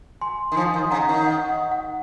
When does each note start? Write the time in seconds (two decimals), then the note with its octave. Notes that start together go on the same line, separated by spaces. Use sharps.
0.21 G#5 C6
0.52 D#3
0.56 F3 G#5 C6
0.74 D#3
0.91 C#3 F#5 A#5
1.09 D#3
1.26 F#5
1.49 F#5
1.72 F#5